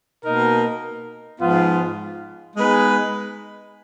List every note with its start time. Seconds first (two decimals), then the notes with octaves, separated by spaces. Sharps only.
0.23 B2 A#3 D#4 A#4
1.40 G#2 F3 B3 F4
2.56 G#3 B3 D#4 G#4 B4